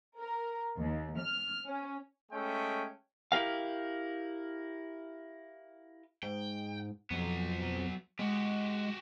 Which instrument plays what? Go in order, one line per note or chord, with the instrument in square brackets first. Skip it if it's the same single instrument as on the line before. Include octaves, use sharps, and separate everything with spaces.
[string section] A#4
D#2
F6
C#4
[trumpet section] G#3 A3 C#4 G5
[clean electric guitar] E4 G4 A#4 F5
[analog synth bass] G#2 [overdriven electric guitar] G5
[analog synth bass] F2 [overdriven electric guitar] F#3 B3
[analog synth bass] G#3 [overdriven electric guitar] F#4 G4